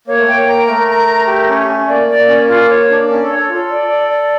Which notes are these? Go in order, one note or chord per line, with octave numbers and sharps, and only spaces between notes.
A#3 C#5
A3
A#3 G5
A#3 A#5
A3 A#4
A#5
A#4
G4
C#4
C#4
A#3 D5
D5
A#3
C#4
F4
C#5
D4
C#4 D4
A4 C#5
A4
F4
A4
D5
D5
D5